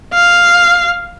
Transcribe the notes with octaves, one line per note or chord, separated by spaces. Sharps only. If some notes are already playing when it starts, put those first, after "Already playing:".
F5